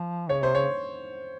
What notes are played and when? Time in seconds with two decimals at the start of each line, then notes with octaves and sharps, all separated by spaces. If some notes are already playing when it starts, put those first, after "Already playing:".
Already playing: F3
0.29 C#3 C#5
0.42 C3 C5
0.54 C#3 C#5